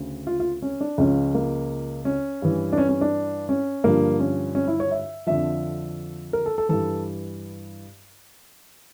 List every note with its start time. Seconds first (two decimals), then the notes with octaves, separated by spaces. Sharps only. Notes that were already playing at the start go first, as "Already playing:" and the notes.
Already playing: D2 C#3
0.27 F4
0.40 F4
0.62 C#4
0.81 D4
0.98 C#2 C#3 F3 C#4
1.35 A#3
2.05 C#4
2.42 G2 E3
2.73 D4
2.78 C#4
2.89 C#4
3.01 D4
3.49 C#4
3.84 G2 D3 F3 A#3
4.20 C#4
4.55 C#4
4.68 E4
4.80 C#5
4.91 E5
5.27 F2 D3 F3 E5
6.33 A#4
6.46 A4
6.58 A4
6.69 G2 E3 A4